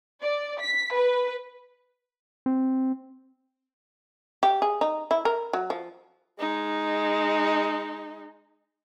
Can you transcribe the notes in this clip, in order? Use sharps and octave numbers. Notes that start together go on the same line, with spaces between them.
D5
B6
B4
C4
G4
G#4
D#4
E4
A#4
F#3
F3
G#3 D#4